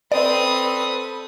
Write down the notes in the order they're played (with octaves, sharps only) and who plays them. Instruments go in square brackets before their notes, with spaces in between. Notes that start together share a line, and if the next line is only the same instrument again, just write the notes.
[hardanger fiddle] C4 D#6 [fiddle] A4 B4 [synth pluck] D5